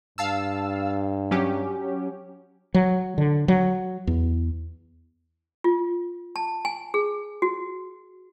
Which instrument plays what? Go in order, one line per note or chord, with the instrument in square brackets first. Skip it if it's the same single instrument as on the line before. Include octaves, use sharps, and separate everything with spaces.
[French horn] G2 [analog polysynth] F5 A5 E6
[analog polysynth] F#3 C#4 G4
[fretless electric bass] F#3
D3
F#3
E2
[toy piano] F4
A5
G#5
G#4
F#4